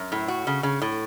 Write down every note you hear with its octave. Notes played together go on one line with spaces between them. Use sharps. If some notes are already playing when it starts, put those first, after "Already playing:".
Already playing: F#2
A2
F#4
C#3
C#3
A2